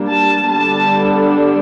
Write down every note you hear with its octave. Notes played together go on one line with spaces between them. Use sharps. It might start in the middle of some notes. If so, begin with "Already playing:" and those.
Already playing: G3 A#3 D4
A5
D3 G3 B3 D4 A5